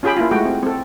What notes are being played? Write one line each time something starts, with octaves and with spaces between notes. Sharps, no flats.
C#4 F4 G4 G#4 G5 B5
A#3 E4 F4
G#3 A3 F#4 G5
C4
C4 A4